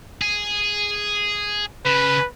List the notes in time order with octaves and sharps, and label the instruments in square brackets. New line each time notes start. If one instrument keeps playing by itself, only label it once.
[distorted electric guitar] G#4
[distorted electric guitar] C#3 [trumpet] B4